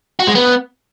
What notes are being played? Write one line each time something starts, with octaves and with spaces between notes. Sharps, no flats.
F#4
G#3
B3